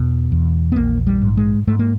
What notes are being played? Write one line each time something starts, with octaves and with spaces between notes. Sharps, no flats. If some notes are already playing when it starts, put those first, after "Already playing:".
Already playing: E2 B2
E2
B3
A#1 A#3
G3
G#2
G#3
G#2 A3
A#3